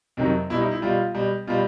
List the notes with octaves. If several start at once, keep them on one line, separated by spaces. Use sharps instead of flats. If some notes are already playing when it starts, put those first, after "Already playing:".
F2 C3 D#3 F#3
B2 G3 E4
D#4
E4
B2 G3 F4
B2 G3
B2 G3 F4